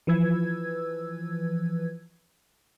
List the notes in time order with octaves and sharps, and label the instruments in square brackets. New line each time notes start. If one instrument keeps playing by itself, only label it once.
[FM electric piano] E3 F3 B4 E6 G#6